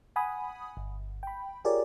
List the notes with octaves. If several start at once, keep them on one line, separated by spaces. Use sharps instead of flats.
F#5 G#5 B5 D#6
G1
G5 B5
F4 G4 G#4 A#4 C#5 D5